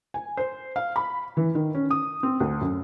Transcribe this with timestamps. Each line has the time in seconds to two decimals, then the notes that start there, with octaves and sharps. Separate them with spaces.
0.14 G#5
0.37 C5
0.76 F5
0.96 B5
1.37 E3
1.55 D#3
1.75 C#4
1.91 D#6
2.23 C4
2.40 D2
2.61 F#2